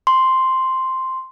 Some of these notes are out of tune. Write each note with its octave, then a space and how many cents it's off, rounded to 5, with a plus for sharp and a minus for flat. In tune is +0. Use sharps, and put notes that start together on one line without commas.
C6 +0